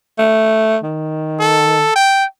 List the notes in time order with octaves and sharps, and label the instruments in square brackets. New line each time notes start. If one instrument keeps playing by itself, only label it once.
[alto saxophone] A3
D#3
[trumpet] A4
G5